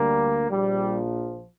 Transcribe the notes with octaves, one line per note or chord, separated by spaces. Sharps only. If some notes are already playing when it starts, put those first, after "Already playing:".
Already playing: D2 D3 G3 A#3
A#1 A#2 F3 G3